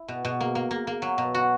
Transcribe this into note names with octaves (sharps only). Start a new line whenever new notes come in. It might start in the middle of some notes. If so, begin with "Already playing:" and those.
Already playing: E4
B2
B2
A#3
A#3
A#3
A#3
F#3
B2
F#4